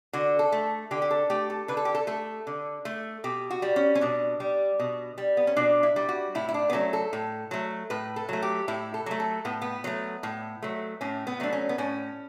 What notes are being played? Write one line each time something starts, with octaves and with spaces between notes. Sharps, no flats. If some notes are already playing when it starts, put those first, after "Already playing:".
D3 F#4
A4
A3
D3 G4
G4
A4
A3 G4
A4
D3 B4
A4
G4
A4
A3 A4
D3
A3
B2 G4
F#4
G3
C#4
C#4
B2 D4
G3
B2
G3
B3
C#4
B2 D4
E4
G3
F#4
A2 E4
E4
D4
B3
F#3 A3 C#4
A4
A2
F#3 A3
A2 B4
A4
F#3 A3
G4
A2 E4
A4
F#3 A3
A4
A2 B3
B3
F#3 A3
A2
F#3 A3
A2 C#4
B3
F#3 A3 D4
C#4
B3
A2 C#4